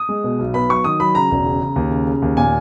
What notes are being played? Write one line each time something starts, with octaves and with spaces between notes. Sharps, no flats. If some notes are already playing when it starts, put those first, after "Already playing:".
Already playing: D#6
G#3
B2
B1
B3 B5
F#3 C#6
D#3 D#6
F#3 B5
C#3 A#5
E1
C#3
C#3
D#2
C#3
C#3
D#2
A#2 G#5